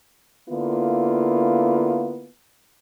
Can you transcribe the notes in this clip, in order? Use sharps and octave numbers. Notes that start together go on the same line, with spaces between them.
D3 A#3 B3 E4 F4